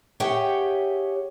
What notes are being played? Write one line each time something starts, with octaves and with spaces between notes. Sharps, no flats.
G4 G#4 C#5 E5 F#5 G5